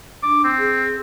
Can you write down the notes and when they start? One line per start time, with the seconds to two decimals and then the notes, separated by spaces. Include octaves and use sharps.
0.23 D4 D6
0.44 C4
0.59 G#4